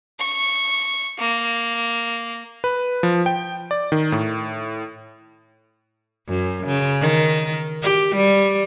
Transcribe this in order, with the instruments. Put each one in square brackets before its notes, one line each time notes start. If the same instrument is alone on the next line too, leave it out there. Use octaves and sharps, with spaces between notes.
[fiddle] C#6
A#3
[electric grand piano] B4
F3
G5
D5
D#3
A2
[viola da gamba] F#2
C#3
D#3
G4
G3